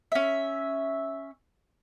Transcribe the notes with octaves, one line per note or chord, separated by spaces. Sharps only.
C#4 E5